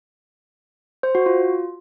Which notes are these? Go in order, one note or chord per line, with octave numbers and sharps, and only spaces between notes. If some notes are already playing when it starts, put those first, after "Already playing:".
C5
F#4
F4